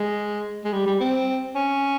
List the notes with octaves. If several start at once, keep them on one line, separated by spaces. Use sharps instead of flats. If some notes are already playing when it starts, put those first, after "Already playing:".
Already playing: G#3
G#3
G3
G3
C4
C#4